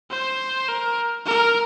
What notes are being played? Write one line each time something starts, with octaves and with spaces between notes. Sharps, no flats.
C5
A#4
A#4